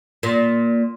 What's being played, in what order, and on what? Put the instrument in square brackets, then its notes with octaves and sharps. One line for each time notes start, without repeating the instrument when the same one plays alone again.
[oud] A#2